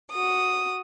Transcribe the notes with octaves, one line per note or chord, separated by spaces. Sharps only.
F#4 D#6